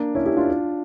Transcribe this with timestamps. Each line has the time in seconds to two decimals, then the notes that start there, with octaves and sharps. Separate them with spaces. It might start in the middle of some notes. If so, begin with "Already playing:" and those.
Already playing: A#3 D4
0.15 C#4 E4
0.26 E4 G4
0.37 D4 F4